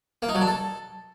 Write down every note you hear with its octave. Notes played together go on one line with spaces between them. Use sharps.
A#3
D#4
F#3
D4
A4